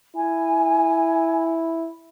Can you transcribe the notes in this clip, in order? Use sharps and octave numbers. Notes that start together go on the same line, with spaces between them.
E4 G#5